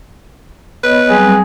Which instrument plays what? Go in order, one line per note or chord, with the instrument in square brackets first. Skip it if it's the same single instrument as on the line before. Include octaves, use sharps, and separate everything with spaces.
[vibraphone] B3 C#5 D#5 [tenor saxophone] B4
[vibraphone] F#3 G3 C4 [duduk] G#4